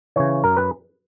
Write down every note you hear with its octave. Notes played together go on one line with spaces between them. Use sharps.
C#3 E3 C#5
F#2 A#4
B4